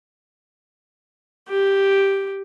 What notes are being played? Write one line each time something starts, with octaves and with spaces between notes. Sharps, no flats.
G4